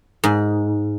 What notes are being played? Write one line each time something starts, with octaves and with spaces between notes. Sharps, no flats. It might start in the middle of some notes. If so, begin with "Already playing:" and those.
G#2